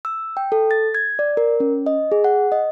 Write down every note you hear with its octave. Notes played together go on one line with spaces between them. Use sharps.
E6
G5
A4
A6
G#6
D5
A#4
C#4
D#5
G#4
F#5
D#5